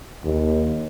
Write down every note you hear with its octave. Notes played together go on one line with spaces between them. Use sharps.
D#2